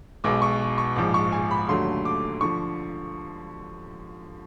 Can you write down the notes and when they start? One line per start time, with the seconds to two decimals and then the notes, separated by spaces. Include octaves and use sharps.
0.24 B1 B2 G#3 D6
0.42 C#6
0.78 C#6
0.96 A#1 G#2 F3 G#3 D6
1.14 C#6
1.32 G#5
1.51 B5
1.68 D#2 D3 F#3 A3 C6
2.05 D6
2.41 D3 F3 C#6